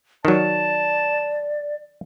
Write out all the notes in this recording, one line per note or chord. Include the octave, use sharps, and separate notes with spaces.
D#3 F#3 D5 A5